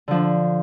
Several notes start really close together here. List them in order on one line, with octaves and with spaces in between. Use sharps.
D3 F3 D4